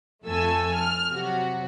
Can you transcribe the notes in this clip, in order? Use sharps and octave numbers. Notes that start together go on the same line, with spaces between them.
F2 A3 A4 G#5 E6
F6
C3 F#3 F#4